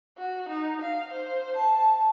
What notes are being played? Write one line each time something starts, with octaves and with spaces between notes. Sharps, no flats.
F#4
D#4
F5
C5
A5